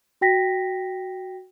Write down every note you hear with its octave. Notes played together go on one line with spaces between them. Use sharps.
F#4 G5 A#6 B6